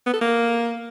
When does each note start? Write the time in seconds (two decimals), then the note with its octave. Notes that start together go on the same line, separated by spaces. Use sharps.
0.06 B3
0.14 A4
0.21 A#3